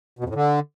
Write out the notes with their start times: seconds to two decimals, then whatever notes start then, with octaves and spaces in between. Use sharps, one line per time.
0.19 B2
0.24 F2
0.30 A2
0.35 D3